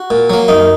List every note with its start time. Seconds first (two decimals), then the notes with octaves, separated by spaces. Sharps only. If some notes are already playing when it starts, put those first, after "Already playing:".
Already playing: F#4
0.10 A#2
0.30 F#3 A#3
0.48 F#2 D#4